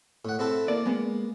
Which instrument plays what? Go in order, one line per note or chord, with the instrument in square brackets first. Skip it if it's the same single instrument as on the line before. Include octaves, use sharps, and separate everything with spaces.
[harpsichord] A2 F#5
C4 E4 A4
[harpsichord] A#3 [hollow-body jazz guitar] D5
[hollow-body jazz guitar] G#3 B3